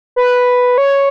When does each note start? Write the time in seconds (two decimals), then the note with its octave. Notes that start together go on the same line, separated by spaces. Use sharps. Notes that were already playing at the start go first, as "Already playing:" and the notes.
0.16 B4
0.78 C#5